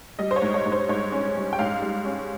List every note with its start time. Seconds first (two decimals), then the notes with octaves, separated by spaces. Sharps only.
0.19 G3 D#5
0.31 C5
0.36 C#5
0.42 G#2
0.54 C#5
0.66 G#2
0.72 C5
0.89 G#2 C#5
1.12 C#4
1.36 G3
1.53 G5
1.59 G#2 F5
1.82 G3
2.05 C#4